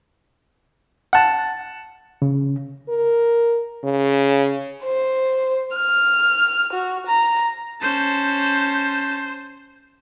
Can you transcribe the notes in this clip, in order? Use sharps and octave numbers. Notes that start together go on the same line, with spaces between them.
F#5 A5
C#3
A#4
C#3
C5
F6
F#4
A#5
C#4 C5 A5 G6